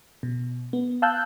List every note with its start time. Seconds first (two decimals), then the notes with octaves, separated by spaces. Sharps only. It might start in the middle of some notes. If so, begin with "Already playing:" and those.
0.23 B2
0.73 B3
1.02 F5 A5 E6 F#6 G6